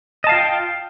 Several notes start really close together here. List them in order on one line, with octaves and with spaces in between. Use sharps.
D#5 A5 F5 F4 G5